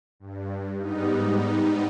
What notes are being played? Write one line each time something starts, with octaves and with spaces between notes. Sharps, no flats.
G2
G#2 G3 B3 D#4